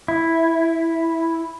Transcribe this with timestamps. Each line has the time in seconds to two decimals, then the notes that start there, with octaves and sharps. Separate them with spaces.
0.08 E4